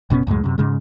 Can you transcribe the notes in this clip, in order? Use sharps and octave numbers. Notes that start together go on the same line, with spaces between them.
F#1 B2 B3 C#4
C#2 F#2 A2 G#3
F#2 C3
G#2 C#3 G#3